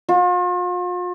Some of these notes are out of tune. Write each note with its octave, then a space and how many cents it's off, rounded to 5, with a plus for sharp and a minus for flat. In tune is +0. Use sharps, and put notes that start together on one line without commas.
F4 +40